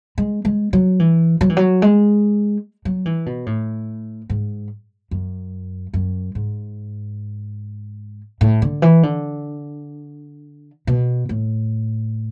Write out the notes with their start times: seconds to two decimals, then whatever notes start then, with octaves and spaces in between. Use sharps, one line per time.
0.18 G#3
0.45 G#3
0.73 F#3
1.00 E3
1.41 F#3
1.49 E3
1.57 F#3
1.82 G#3
2.85 F#3
3.05 E3
3.26 B2
3.46 A2
4.30 G#2
5.11 F#2
5.94 F#2
6.35 G#2
8.41 A2
8.62 D3
8.82 E3
9.03 D3
10.87 B2
11.29 A2